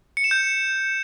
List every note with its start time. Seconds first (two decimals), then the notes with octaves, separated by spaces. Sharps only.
0.17 C#7
0.24 E7
0.31 G6